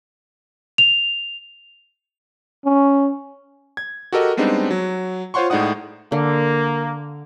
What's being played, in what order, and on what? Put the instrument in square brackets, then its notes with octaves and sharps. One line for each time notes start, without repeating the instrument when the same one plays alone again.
[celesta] F7
[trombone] C#4
[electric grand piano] G#6
F#4 G4 A4 A#4 D#5
G3 G#3 B3 C4 D4 D#4
F#3
F4 C5 C#5 F#5 C6 C#6
A2 G#3 D#4 D5 F#5 D#6
[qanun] D3 [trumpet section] A#3